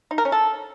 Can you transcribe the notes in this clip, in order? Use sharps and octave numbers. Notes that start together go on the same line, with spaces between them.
D#4
A#4
C#4
A4